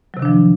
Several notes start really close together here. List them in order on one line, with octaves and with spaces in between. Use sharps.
F#3 C3 D#3 D4 F3